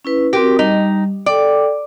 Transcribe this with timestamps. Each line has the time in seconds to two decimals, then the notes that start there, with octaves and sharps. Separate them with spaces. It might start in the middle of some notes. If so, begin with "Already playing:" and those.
0.05 C#4 E4 B4
0.33 C4 F#4 G4 A#4
0.59 G3 D#4
1.26 A4 D5 G5